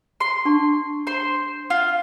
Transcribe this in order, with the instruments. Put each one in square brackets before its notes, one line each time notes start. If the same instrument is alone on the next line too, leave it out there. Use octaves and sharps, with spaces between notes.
[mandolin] C6
[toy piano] D4 A5 C#6
[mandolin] C5 C6
F4